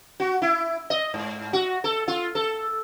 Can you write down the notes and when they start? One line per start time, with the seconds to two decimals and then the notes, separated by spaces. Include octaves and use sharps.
0.20 F#4
0.42 E4
0.90 D#5
1.14 G#2
1.53 F#4
1.84 A4
2.08 F4
2.35 A4